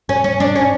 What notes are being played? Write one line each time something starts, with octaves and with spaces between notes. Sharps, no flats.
C#4
C#4
D4
C#4